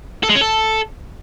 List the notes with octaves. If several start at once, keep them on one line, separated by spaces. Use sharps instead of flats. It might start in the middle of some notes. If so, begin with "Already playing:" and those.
A4
G#3
C#4
A4